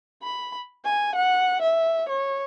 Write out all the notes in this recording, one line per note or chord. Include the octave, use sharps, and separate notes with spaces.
B5
G#5
F#5
E5
C#5